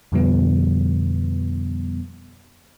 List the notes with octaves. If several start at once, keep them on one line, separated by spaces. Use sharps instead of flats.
F2 B2 D3 F3 G3 B3